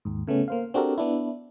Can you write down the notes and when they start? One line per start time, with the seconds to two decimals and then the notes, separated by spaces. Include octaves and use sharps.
0.05 D#2 G#2
0.27 C#3 A3 B3 C#4
0.48 A#3 C5 F5
0.74 C4 D4 F#4 G4 A4 A#4
0.98 B3 D4 E4